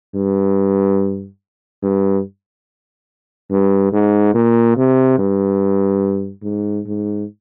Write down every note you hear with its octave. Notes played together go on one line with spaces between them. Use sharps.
G2
G2
G2
G#2
A#2
C3
G2
G#2
G#2